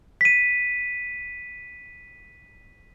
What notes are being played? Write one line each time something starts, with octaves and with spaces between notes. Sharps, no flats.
B6 D#7